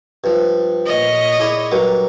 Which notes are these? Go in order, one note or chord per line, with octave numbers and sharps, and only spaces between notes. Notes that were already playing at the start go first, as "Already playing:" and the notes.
G2 F3
A#2 C#5 D#5
E4 G#4 D5
G2 F#3 A#3